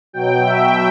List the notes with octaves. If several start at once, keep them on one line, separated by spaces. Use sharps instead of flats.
B2 F#3 G5
E5